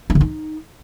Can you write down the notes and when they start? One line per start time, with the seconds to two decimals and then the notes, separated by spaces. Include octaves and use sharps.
0.10 D4
0.15 D3
0.21 D#4